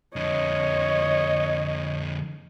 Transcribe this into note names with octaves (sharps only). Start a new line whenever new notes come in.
F2 D3 C#5 D#5